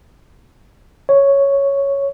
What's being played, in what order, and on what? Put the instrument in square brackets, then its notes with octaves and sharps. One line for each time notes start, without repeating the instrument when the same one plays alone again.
[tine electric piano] C#5